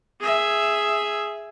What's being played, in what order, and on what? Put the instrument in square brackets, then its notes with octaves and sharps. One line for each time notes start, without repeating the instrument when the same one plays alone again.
[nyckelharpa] G#4 E5